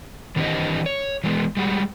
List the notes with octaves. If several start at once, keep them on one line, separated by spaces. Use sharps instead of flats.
D#3 E3 C4 D4 G4 D#5
C#5
E3 F#3 G#3 B3
G3 G#3 F#4